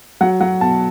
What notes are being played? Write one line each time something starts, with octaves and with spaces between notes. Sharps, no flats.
F#3 F#5
F#3 F#5
B2 A5